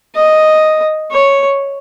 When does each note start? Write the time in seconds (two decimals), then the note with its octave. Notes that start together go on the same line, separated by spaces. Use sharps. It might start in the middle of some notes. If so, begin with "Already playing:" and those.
0.15 D#5
1.12 C#5